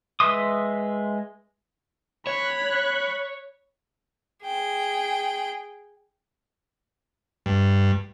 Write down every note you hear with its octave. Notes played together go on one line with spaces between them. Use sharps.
G#3 B4 E5 C6 D#6
C#5 B5 F#6
G#4 G5
G2